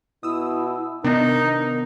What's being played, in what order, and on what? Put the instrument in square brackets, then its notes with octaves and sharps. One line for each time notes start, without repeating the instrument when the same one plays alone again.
[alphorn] B2 [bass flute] E4 [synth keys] D#6 E6
[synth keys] C3 B3 D4 [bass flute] D#3 [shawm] D#4 [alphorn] A#4